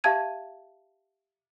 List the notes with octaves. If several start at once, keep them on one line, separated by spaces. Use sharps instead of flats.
G4 E5 F5 A5 G#6 D#7